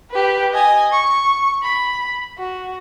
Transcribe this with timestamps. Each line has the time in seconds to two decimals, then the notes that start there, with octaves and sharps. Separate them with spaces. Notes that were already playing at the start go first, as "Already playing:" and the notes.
0.10 G4 B4
0.53 D#5 G#5
0.91 C#6
1.63 B5
2.38 F#4